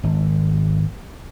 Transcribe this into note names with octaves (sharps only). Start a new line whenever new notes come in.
G#1